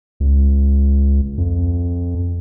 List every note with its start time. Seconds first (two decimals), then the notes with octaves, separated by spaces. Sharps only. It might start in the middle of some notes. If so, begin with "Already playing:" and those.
0.20 C#2
1.38 F2